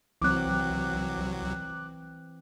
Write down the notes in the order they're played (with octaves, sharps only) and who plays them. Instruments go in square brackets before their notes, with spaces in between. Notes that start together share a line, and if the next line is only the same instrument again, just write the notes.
[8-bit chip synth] C2 F#3 [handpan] E3 C4 [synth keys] D6 F#6